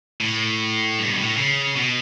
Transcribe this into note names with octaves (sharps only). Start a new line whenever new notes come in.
A2
G2
B2
A2
C#3
B2